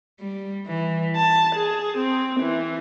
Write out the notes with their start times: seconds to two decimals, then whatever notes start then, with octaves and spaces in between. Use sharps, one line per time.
0.20 G3
0.65 E3
1.17 A5
1.57 G#4
1.98 C4
2.41 E3